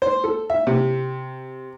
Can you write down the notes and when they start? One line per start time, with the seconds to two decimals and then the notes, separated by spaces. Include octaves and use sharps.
0.02 C5
0.24 A4
0.50 E5
0.67 C3